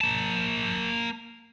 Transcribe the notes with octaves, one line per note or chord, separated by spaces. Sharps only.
A#3 A5